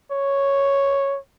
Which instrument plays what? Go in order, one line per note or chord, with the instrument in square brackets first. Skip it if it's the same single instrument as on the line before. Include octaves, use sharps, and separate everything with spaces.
[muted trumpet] C#5